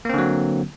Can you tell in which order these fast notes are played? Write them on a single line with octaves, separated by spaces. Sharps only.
A#3 C4 D3 F#3